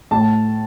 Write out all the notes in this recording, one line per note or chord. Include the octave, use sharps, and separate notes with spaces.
A2 A5